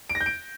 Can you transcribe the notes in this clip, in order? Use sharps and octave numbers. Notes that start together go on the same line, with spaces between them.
D7
A#6
G6
D7